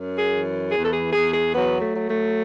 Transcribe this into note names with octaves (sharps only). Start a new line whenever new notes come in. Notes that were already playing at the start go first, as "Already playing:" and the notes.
Already playing: F#2
G#4
E3
E2 G#4
A4
G#4
E2 G#4
G#4
F#3 B3
A3
F#3
A3